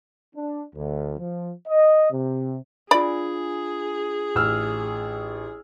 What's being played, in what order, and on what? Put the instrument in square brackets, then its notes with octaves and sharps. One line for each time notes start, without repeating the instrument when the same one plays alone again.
[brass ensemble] D4
D2
F3
D#5
C3
[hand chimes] D4 F4 [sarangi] G#4 [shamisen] D5 B5
[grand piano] A1 E6 F6